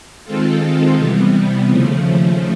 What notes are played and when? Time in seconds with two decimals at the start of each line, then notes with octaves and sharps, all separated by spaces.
0.25 D#3 G#3 C4 F4 A4
0.97 C3 E3 G3 B3
1.69 D#2 C#3 F3 A3